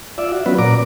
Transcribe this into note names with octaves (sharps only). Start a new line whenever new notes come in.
F4 D5 E5
F#4
F#3 B3 C#4 F4 F#4 B4
A#2 D5 A#5 D6